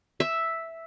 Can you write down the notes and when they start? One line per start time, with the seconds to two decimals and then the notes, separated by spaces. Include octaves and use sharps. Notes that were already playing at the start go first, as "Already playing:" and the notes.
0.20 E5